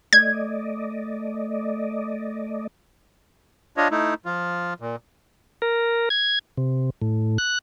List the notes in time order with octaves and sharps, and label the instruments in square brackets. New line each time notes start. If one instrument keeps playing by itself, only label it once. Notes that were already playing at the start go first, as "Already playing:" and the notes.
[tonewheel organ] A3 D5 D#5 [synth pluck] G#6
[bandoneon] D4 F4 C#5 D#5
A3 D#4 E4
F3 F4
A#2
[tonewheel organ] A#4
G#6
C3
A2
F#6